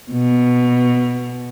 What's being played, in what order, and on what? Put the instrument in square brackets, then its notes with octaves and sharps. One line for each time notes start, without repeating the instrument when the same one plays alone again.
[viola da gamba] B2